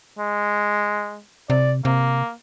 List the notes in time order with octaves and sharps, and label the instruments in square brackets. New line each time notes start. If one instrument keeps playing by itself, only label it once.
[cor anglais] G#3
[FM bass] C3 [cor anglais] D5
[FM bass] C3 [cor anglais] A#3